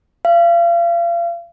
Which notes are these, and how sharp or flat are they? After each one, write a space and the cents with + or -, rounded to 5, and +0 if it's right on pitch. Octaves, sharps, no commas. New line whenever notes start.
F5 -35